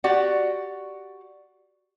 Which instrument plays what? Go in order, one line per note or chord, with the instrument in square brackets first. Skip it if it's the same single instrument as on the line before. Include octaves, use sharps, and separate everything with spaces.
[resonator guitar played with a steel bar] F#4 G4 D5 F#5